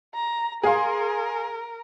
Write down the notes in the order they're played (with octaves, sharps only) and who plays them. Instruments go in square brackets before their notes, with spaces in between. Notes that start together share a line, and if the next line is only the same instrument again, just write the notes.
[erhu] A#5
[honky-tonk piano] G#4 F5 C6 [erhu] A#4